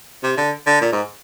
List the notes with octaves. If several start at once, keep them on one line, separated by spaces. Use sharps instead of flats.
C3
D3
D3
A#2
G#2